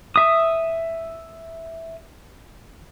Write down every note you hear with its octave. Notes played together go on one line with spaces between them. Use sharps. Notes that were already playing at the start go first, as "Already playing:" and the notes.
E5 D#6